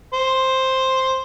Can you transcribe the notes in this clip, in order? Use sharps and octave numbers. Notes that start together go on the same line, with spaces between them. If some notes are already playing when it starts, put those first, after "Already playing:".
C5